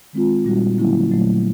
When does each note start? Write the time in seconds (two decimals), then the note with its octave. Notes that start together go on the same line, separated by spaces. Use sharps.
0.13 D#3 G#3 C4 F4
0.45 A#2 G3 A#3 D#4 F#4
0.78 D3 F#3 A#3 C#4 E4
1.11 A#2 F#3 A3